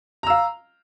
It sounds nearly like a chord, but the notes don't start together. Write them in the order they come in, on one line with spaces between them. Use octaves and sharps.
A#5 E6 F5